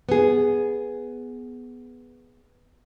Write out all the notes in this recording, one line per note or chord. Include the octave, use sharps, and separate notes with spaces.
B3 G#4